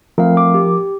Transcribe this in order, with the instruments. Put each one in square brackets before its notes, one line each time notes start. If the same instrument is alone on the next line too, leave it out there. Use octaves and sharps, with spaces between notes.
[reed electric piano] F3 A#4 [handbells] A3 C4 F5
[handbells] D6
G4